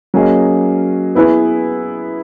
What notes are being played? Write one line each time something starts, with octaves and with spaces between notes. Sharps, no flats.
F#3 A#3 C#4 G#4 D#5
B3 E4 G#4 B4